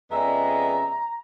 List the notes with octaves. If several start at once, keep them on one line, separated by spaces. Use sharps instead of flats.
F2 C#3 G#3 B3 D5 E5 A#5